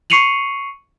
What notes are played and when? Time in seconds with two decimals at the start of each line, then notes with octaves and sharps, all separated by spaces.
0.10 C#6 C7 C#7 D#7 F7 F#7